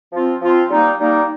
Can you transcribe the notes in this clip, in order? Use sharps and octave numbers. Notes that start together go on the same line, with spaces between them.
F3 C4 F4
F3 C4 F4
G3 A#3 D#4
G3 A#3 D#4